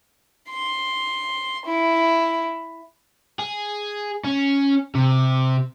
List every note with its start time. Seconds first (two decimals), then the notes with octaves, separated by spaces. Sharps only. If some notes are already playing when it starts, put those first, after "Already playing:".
0.50 C6
1.65 E4
3.39 G#4
4.24 C#4
4.95 C3